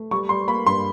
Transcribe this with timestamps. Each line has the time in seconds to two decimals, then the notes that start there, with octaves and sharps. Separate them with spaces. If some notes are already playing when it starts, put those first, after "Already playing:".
Already playing: A3
0.11 G3 C#6
0.29 G3 C6
0.48 A#3 B5
0.66 G2 C6